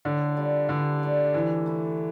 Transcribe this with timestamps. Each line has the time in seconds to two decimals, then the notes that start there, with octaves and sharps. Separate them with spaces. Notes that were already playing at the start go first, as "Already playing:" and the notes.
0.05 A2 D3
0.37 G3 D4 F4
0.69 D3 E3
1.02 A3 D4 G4
1.34 E3 F3
1.66 A3 E4 A4